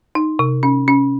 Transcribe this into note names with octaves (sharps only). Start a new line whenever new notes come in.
D#4
C3
C#4
C#4